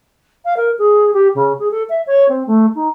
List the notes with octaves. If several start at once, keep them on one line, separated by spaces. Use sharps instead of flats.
F5
A#4
G#4
G4
C#3
G#4
A4
E5
C#5
C4
A3
D#4